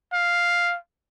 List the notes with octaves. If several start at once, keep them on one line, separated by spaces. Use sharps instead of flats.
F5